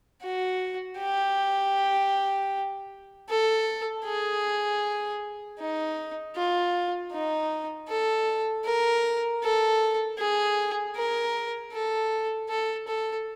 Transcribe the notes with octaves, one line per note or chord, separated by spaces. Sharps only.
F#4
G4
A4
G#4
D#4
F4
D#4
A4
A#4
A4
G#4
A#4
A4
A4
A4